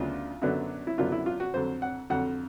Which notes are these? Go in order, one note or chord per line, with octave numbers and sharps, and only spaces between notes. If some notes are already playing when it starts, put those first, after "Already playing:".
Already playing: D2 C#3 F#3 B3 D4 F4
F#2 D3 F#3 B3 D4
E4
F#2 D3 F#3 B3 D4 F4
E4
F4
F#4
F2 D3 F#3 C5
F#5
F2 D3 F#3 F#5